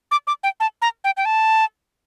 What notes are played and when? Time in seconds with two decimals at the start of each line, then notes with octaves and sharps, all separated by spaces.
0.11 D6
0.27 D6
0.43 G5
0.60 A5
0.82 A#5
1.04 G5
1.17 G5
1.25 A5